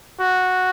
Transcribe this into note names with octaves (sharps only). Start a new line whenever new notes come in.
F#4